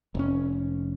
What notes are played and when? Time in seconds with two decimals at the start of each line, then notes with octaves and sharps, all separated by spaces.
0.15 F1 C#4